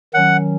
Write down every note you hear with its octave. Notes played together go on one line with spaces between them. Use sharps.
D#3 F#3 C#4 F#5